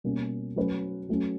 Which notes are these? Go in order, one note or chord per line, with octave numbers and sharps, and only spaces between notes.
B2 G3 A#3 C#4
F#3 A3 C#4 F#4 B4
F#3 A3 C#4